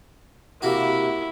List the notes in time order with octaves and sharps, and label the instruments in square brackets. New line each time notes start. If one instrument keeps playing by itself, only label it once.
[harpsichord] C3 A#3 F#4 [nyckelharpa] E4